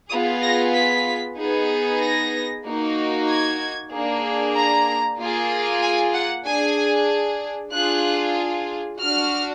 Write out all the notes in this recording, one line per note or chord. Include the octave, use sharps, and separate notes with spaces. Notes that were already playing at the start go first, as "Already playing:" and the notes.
B3 F4 G#4 D#6
A#6
B6
B3 D#4 G#4
A#6
A#3 D#4 F#4
G#6
A#3 D4 G#4
A#5
A#3 F4 G#4
G#5
F#5
D4 G#4 G#5
D4 F4 G#4 F#6
D4 F#4 F6